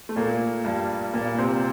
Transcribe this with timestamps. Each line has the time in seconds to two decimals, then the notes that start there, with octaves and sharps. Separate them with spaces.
0.09 A3
0.16 A#2 A#3
0.65 G2 G3
1.14 A#2 A#3
1.38 C3 C4